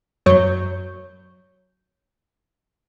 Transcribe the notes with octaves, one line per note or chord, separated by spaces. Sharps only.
F#2 F#3 C#5 G6